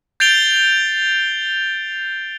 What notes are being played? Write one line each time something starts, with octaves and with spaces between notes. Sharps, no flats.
G6 A6 C7 D7 F7 G7